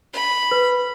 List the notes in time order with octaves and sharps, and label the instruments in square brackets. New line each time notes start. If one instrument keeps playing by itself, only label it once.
[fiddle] B5
[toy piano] B4